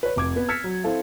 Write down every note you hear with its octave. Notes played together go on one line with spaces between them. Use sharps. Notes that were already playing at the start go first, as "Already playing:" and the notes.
B4 C#5
F1 D6 G#6
B3 B4
E6 F6 G#6 A6 B6 C#7
F#3
C4 E4 A4 F5